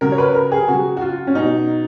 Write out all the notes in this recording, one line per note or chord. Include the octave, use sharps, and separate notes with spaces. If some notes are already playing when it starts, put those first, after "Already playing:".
C#3 F#3 A#4
C#5
B4
A#4
G#4
C#3 F#3 F#4
F#4
F4
C#4
B2 F#3 D#4